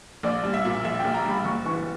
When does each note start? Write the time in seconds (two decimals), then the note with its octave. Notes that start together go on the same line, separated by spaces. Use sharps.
0.23 A#1 D5
0.44 G3
0.54 E5
0.65 A#2
0.84 A#1 E5
0.99 A#1 G5
1.14 A#5
1.25 G3 B5
1.44 F#1 C#6
1.65 E3 C#6